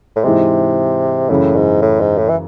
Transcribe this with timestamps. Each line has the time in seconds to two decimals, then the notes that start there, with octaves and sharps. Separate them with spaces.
0.16 A2
0.24 G#2 C3 E3 G#3
1.30 F#2 A2 C#3 E3
1.56 G#2
1.82 A2
2.00 G#2
2.18 A2
2.29 E3